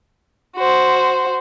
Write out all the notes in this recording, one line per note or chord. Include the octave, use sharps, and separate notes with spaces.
F#4 C5